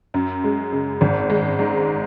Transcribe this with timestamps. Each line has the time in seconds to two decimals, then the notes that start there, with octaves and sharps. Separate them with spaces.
0.14 F#2
0.44 G#3
0.72 C#3
1.01 G#1
1.30 G#3
1.59 G#2